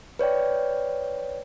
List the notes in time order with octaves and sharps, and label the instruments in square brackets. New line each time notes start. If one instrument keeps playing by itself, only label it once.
[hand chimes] B4 C#5 D5 G5